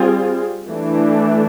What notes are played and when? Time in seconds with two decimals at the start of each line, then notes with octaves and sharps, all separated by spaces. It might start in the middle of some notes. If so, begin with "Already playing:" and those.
Already playing: G3 C4 F4 G#4
0.68 E3 A3 D4